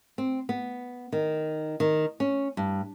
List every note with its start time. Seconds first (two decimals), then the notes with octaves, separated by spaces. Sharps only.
0.18 C4
0.49 B3
1.12 D#3
1.80 D#3
2.20 C#4
2.57 G2